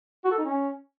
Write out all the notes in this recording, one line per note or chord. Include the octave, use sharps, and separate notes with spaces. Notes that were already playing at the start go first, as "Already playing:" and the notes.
F#4
A4
D#4
C#4